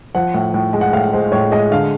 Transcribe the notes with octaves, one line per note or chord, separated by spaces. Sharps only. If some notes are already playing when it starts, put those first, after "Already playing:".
F3 F#5
A2
A2
G#3
F#5
A2 F5
G#3 C5
A2 C#5
G#3 D#5
D3 F5